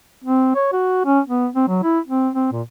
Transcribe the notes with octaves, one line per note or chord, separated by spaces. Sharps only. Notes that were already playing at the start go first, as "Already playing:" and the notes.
C4
C#5
F#4
C#4
B3
C4
F#3
E4
C4
C4
A#2